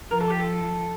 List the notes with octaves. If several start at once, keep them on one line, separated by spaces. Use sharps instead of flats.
F3 A#4
A4
G4
A4